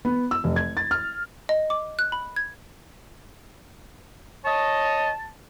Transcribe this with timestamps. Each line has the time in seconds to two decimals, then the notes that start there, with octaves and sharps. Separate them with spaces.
0.05 B3
0.31 E6
0.44 F1
0.56 G#6
0.77 A6
0.91 F6
1.49 D#5
1.70 D6
1.99 F#6
2.12 B5
2.36 G#6
4.45 C#5 D#5 A5